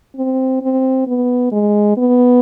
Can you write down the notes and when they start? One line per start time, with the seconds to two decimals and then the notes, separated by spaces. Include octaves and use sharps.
0.16 C4
0.62 C4
1.07 B3
1.52 G#3
1.97 B3